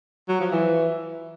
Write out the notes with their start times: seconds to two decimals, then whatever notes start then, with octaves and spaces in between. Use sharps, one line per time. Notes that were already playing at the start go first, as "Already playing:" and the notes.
0.28 F#3
0.40 F3
0.51 E3